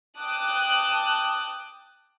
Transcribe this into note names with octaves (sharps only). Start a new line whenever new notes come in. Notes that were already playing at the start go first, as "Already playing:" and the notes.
G5 A5 D6 D#6 F#6